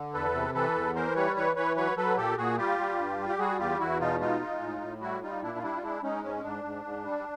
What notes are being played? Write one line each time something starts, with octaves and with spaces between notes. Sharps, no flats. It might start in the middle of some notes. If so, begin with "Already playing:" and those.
Already playing: D3
E2 A4 B4
C3
E3 A4 B4
E2
E3 A#4 C5
G3 B4 C#5
E3 B4 C#5
E3 B4 C#5
F#3 B4 C#5
F#3 A4 B4
A#2 G4 A4
A#2 F#4 G#4
G3 F4 G4
G3
G2
G3
G4
G3 F#4 G#4
E2 F4 G4
E2 E4 F#4
B2 D#4 F4
G#3 D#4 F4
G#3
A2
A2
G3 E4 F#4
G3 D#4 F4
A#2 D4 E4
F4
G3 D4 E4
F4
G#3 D4 E4
G#3 C#4 D#4
G#2 C#4
G#2 D4
G#2
G#2
G3